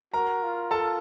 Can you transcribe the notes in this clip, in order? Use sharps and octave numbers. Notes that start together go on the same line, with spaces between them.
F#4 A#4 A#5
F4
A4 A5